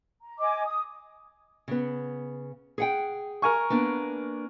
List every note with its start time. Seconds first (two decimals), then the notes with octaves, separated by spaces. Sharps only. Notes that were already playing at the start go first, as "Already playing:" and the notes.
0.23 A#5
0.39 D#5 G#5 D6
0.66 D#6
1.68 C#3 B3
2.78 G#4 F#5 G5
3.42 A#4 G#5 C#6
3.70 A#3 B3 D4